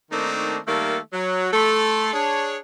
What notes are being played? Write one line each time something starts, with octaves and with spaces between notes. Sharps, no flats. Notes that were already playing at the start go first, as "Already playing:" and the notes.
D#3 A3 A#3 C4 D4 D#4
D#3 G3 A3 A#3 A4
F#3
A3 A4 C6
D4 G#4 C#5